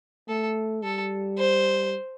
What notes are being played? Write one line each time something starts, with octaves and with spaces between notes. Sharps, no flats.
A3 A4
G3 A4
C5